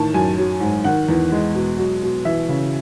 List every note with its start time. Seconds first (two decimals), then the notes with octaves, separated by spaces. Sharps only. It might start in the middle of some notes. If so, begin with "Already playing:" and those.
Already playing: A2 D#3 E3 A5
0.14 F#2 G#5
0.38 F#3
0.60 G#2
0.84 D#3 F#5
1.09 E2
1.32 G#3
1.55 B2
1.78 F#3
2.02 B2
2.25 E3 E5
2.49 C#3